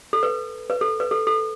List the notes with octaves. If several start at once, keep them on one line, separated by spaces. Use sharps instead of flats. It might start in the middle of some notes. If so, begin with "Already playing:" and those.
A4
B4
B4
A4
B4
A4
A4